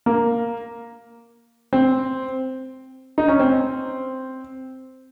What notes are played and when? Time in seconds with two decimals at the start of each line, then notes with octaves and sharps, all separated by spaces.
0.06 A#3
1.73 C4
3.18 D#4
3.28 C#4
3.39 C4